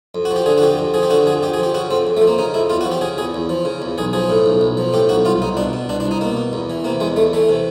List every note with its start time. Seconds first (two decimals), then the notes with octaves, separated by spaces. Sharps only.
0.15 F2
0.25 F#4
0.31 F3
0.36 G4
0.46 D3 G#4
0.58 F#4
0.62 F2 G4
0.79 F2
0.94 F3 G#4
1.03 G4
1.10 D3 F#4
1.26 F2 G#4
1.43 F2 G4
1.54 G#4
1.59 F3 G4
1.74 C#3 F#4
1.91 F2 C4
2.07 F2
2.17 A3
2.22 F3
2.27 A#3
2.38 C#3 D#4
2.54 F2 E4
2.70 E2 F4
2.81 F#4
2.86 F3
2.92 G4
3.01 C#3 G#4
3.18 E2 G#4
3.34 E2
3.49 F3
3.65 C#3
3.82 E2
3.98 B1 G#4
4.13 F3 G#4
4.30 A2
4.46 B1
4.61 B1
4.77 F3
4.93 A2 G4
5.09 B1 F#4
5.25 C2 F4
5.42 C2 D#4
5.57 B2 D4
5.73 B2
5.89 C2 D4
6.00 D4
6.06 C2
6.11 D#4
6.21 B2 A#3
6.37 B2
6.53 E2
6.70 E3
6.84 C3 A#3
7.00 E2 G#3
7.16 E2 A3
7.33 E3 A3
7.49 C3